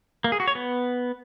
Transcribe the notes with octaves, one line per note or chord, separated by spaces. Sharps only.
A#3
G#4
F#4
C#5
B3